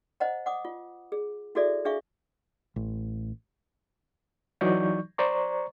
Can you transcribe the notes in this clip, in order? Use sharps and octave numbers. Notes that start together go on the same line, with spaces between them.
C5 D#5 F#5 A#5
F#5 D6 D#6
F4
G#4
E4 F#4 G#4 A4 D5 E5
D4 G#4 E5 F5 C#6
A1
E3 F#3 D#4 D5 C#6 G6
C5 D5 A#5 C#6